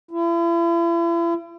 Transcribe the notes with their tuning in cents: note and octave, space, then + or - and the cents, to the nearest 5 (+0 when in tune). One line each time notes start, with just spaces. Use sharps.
E4 +40